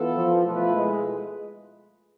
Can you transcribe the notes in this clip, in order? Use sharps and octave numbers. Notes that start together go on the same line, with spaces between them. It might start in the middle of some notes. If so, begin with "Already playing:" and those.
Already playing: E3 B3 F4 A4
F3
B2 F3 A3 E4 B4
G#3